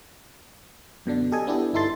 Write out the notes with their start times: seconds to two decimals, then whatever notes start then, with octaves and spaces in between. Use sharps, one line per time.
1.06 F#2 B2 D3 D4
1.32 G4 A4 D#5 G#5
1.47 B3 D4 E4 G4 A4
1.73 G1 D#4 E4 A4 C6 A6